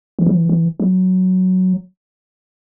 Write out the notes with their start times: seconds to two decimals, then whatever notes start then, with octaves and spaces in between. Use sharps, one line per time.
0.19 E3
0.26 F#3
0.35 E3
0.49 E3
0.80 F#3